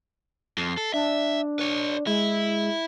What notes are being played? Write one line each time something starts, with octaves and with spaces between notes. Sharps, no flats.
F2 C7
A4
D4 E5
B4 C#5
G#3 E4